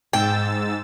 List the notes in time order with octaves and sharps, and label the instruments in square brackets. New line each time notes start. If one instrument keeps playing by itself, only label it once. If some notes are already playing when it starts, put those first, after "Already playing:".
[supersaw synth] G#2 E6 A6 [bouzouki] G5